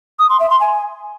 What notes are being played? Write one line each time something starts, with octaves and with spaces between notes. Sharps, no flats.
D#6
C6
E5
C6
G#5